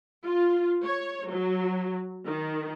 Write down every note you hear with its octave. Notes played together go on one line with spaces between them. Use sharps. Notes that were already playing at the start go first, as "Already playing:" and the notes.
F4
C#5
F#3
D#3